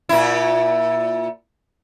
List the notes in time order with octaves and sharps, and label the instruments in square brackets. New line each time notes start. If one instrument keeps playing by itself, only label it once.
[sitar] A#2 E4